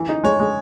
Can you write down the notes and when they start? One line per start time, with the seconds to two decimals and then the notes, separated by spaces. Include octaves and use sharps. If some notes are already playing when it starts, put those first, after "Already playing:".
Already playing: E3
0.09 D#4
0.24 G#3 C#5
0.39 G#3